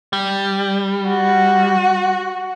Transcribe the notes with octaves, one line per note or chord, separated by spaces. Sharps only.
G3
F#4